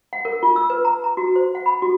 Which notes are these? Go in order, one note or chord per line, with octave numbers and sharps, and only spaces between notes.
F#5
A#4
F4
E6
B4
A#5
A#5
F#4
C5
F#5
B5
F#4